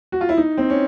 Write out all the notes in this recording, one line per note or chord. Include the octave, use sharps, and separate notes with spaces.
F#4
F4
E4
D#4
C4
C#4